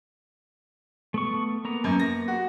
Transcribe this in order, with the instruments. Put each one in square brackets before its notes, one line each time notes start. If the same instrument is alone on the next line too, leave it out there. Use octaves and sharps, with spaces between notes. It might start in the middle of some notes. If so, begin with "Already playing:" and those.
[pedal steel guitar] A3 B3 C#6
A#3 B3 A#5
[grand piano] F#2
A#6
F#4